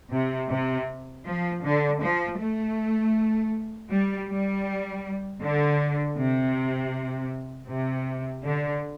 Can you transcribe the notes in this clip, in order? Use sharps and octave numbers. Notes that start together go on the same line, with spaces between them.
C3
C3
F3
D3
F3
A3
G3
G3
D3
C3
C3
D3